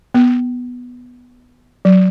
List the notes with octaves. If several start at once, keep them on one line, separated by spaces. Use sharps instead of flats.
B3
F#3